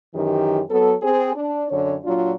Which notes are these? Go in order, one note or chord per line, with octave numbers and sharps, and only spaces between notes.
F#2 D#3 E3 G4
F#3 B3 A4
C4 G#4
D4
F#2 D3 C#5
A#2 F#3 D4 F4